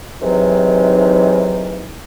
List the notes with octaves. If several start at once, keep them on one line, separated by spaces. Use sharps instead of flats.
G#2 C3 D#3 E3 F#3